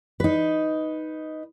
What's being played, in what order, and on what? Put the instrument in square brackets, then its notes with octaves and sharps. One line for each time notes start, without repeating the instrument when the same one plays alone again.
[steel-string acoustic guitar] D#4 B4